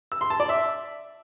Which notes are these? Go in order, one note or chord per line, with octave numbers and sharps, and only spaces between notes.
E6
C6
A5
D5
E5